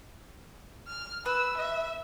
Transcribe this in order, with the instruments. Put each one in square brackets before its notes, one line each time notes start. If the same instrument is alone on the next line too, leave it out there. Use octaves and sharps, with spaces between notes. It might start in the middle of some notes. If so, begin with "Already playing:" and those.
[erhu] F6
[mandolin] B4 [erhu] E6
[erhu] E5